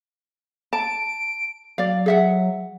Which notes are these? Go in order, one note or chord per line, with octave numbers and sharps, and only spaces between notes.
A5 D7
F#3 D5 F5
G#4 E5 F#5